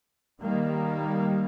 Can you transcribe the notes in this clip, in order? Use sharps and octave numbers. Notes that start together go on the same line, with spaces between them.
D#3 G3 A#3